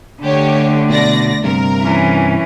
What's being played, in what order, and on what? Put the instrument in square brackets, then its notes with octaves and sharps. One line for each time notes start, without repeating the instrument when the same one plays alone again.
[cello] D3 A3 [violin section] G4 C#5
[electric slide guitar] B2 [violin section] D5 A#6
[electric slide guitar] G2 C3 [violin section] A#4
[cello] E3 C#4